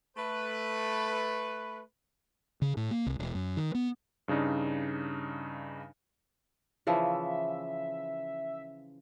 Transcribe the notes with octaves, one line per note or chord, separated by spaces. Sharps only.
A3 B4
C#3
A2
A#3
C2
E1
F#2
D#3
B3
G2 C#3 D4 D#4
C#3 E3 F3 E5